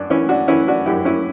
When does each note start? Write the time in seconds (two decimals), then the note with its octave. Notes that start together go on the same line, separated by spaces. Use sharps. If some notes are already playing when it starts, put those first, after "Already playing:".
Already playing: F#2 D4
0.10 E3 C#4 E4
0.29 D4 F#4
0.48 E3 C#4 E4
0.68 D4 F#4
0.86 F#2 E4 G4
1.05 C#4 E4